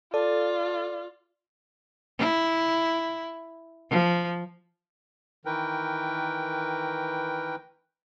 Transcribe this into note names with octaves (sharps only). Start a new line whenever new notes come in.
F4 A4 D5
E4
F3
D#3 E3 A#4 B4 G5